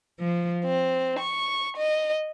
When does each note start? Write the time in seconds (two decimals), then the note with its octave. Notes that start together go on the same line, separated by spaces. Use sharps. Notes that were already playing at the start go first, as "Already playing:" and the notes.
0.20 F3
0.65 C4
1.19 C#6
1.77 D#5